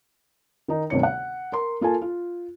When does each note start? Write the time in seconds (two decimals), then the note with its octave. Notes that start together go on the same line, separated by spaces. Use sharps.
0.68 D#3 D#4
0.90 G1 D2 C3 D#3 C#5 C#7
1.03 F#5
1.52 A#4 C6
1.81 A#3 F4 A4 G#5 A5
2.02 F4